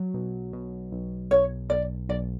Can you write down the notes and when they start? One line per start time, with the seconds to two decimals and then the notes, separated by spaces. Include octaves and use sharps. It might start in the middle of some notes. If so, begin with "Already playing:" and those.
Already playing: F#3
0.14 B1
0.53 B2
0.92 B1
1.31 B1 C#5
1.70 B1 D5
2.09 B1 D5